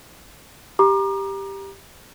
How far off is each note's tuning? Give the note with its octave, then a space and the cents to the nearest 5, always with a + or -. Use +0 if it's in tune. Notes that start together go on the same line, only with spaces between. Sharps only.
G4 +5 A#5 +25 D6 +35